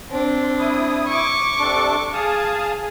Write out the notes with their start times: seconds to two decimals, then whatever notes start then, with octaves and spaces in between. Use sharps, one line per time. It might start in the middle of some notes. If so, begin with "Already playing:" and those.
0.10 C4 D4
0.59 E4 D#6
1.08 C#6 D6
1.60 C3 D4 A4
2.14 G#4 F5 A5 D#6